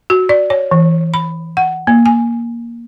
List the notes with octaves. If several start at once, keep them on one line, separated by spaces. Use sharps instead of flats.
F#4
D5
C#5
E3
B5
F#5
A#3
G#5